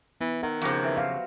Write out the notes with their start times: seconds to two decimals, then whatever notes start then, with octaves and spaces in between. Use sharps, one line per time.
0.21 E3 B3
0.43 D#3 E5 F#5
0.62 F2 C#3 F#4 G4 C5
0.83 E3
0.97 F#3 F5